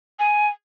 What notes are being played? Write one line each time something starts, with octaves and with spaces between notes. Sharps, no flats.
G#5